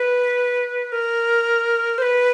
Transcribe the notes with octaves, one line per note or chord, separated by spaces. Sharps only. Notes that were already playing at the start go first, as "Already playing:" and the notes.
Already playing: B4
A#4
C5
B4